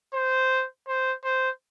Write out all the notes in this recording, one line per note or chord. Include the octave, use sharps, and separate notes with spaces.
C5
C5
C5